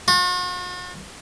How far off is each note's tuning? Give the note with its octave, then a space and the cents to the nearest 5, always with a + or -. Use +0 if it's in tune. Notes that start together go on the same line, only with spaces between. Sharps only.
F#4 -45